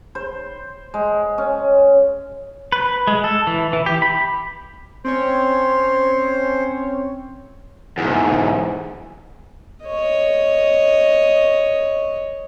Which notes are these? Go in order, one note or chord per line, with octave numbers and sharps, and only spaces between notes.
C5
G#3
C#4
B4
G#3
A4
E3
E3
G4
B5
C4 C#4 C5 C#5
E2 G#2
C#5 D#5